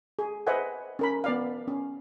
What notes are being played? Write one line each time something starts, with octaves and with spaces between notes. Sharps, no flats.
G#4
B4 C5 D#5 E5 F#5 G#5
C#4 A#4 B5
B3 D5 F5
C#4